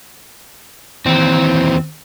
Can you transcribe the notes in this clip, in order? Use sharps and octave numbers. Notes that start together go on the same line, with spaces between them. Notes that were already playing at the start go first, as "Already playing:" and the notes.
D#2 E3 C4